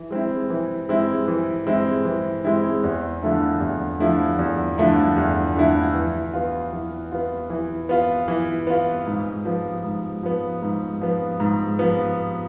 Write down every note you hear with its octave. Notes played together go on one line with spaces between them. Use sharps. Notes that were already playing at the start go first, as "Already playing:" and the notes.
Already playing: E3
G#3 C4 E4
E3
G#3 C4 E4
E3
G#3 C4 E4
E3
G#3 C4 E4
E2
D3 F3 A3 E4
E2
D3 F3 A3 E4
E2
D3 F3 A3 E4
E2
D3 F3 A3 E4
E3
B3 F4
E3
B3 F4
E3
B3 F4
E3
B3 F4
G#2
F3 B3
G#2
F3 B3
G#2
F3 B3
G#2
F3 B3